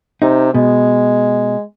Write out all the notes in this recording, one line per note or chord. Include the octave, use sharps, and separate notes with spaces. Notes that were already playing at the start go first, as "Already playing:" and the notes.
C3 D#4
B2 G#3